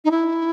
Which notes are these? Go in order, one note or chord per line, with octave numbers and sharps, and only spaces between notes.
D#4
E4